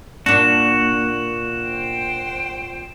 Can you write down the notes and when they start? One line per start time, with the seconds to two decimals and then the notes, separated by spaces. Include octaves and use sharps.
0.26 A#2 A#3 D4 F#4 E7
1.67 C5 G5